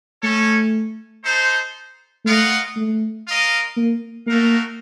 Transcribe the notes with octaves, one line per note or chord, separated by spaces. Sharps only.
A3 C#4 A4 C#5
D#4 A4 C5
A3 F4 A#4 D#5 F#5
A3
F4 A#4 D#5
A#3
A3 A#3 D#4 F#4 A#4 F5